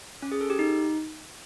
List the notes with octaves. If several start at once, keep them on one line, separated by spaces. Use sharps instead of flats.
C#4
G#4
A4
G4
D#4